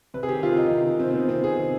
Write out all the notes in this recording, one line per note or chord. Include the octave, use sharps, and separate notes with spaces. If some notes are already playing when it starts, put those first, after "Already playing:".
C3 B4
G#4
D#3 G4
C3 F4
D#3 D#4
C3
D#3
C3 C4
C4
D#3 B3
C3 C4
D#3 G#4
C3